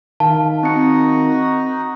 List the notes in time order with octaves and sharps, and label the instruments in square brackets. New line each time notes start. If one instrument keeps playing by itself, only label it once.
[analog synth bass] D#3 [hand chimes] F5 [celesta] A5
[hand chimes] C4 C#7 [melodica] D#4 F#4 D#5